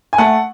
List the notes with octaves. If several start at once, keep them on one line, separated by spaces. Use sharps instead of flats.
G#5
A3 F#5 A5